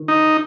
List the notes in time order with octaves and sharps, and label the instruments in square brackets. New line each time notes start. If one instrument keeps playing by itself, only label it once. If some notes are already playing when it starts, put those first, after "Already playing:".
Already playing: [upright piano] D#3
[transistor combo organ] D#4